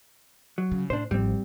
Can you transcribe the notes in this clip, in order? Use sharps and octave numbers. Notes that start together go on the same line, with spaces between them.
F#3
C#3
A2 D4 C5
G#1 F3 G3 C4